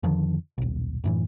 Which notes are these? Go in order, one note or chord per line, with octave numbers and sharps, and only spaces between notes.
F2 D3 D#3 F3
D#1 B1
F#2 A2 E3